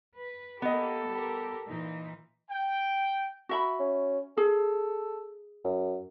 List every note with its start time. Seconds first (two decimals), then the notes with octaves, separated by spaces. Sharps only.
0.18 B4
0.62 A#3 B3 G4 A4 D#5
1.08 G3 G4 A#4
1.68 A#2 E3 D#4
2.50 G5
3.49 F#4 E5 B5
3.80 C#4
4.37 G#4 A4
5.64 F#2